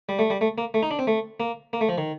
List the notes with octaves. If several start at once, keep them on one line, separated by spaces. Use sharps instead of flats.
G3
A3
G3
A3
A#3
A3
D#4
D4
C4
A3
A#3
A#3
A3
F3
D#3